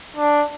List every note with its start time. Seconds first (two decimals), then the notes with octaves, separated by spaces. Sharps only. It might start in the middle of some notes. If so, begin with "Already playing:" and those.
0.16 D4